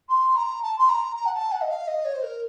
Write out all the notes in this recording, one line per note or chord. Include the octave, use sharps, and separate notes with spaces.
C6
A#5
A5
C6
A#5
A#5
F#5
A5
F#5
D#5
F5
D#5
C#5
C5
A#4